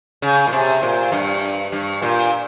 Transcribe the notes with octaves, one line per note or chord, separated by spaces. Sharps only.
C#3
A#2
C3
A#2
G2
G2
A#2